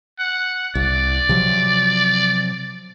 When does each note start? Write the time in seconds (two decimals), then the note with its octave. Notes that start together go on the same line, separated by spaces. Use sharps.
0.19 F#5
0.75 C2 D5
1.29 C3 F3 F#3